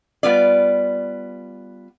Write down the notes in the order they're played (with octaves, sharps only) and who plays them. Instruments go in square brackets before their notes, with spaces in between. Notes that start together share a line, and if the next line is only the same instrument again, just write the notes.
[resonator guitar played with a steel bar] G3 B3 F4 D5